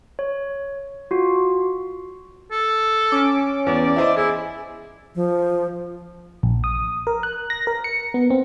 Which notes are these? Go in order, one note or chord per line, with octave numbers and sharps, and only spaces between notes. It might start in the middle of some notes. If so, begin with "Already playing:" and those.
C#5
F4 F#4
A4
C#4 D6
E2 D5
E4 C5 D#5
E4 G#4
F3
A#1
D#6
A#4
F#6
A#6
A#4
C#7
B3
C4